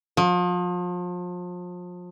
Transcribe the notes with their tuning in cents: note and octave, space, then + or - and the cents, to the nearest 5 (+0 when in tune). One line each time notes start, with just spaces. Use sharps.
F3 +35